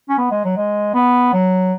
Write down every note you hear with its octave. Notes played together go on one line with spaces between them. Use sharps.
C#4
B3
G#3
F#3
G#3
B3
F#3